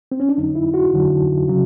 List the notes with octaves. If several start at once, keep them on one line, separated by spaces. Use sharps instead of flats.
C4
C#4
D4
F2 D3 F#3 D#4
E4
F#4
F2 D3 F#3
C#3 F#3